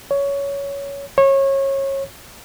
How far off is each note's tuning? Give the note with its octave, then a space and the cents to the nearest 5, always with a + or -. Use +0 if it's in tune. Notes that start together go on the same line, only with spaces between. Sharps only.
C#5 +15
C#5 -25